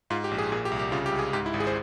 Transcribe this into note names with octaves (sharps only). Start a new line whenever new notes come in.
G#2 F4
G4
A#1
G#4
A#2 G#4
G4
C2
G4
C#3 F4
G4
C#2
G#4
G#2 G4
E4
G#1
G#4
C5